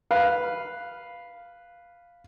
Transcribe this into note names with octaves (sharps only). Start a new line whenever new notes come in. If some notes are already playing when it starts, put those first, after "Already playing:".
B4 F5